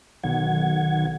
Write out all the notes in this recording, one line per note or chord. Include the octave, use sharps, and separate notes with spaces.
B1 D#3 F#5 G#6